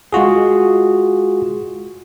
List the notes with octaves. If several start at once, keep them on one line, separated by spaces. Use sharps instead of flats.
G#3 F4 F#4 G#4